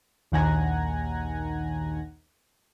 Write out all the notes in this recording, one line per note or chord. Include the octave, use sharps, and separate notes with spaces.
A#1 D#2 D#3 F#5 G#5 A#5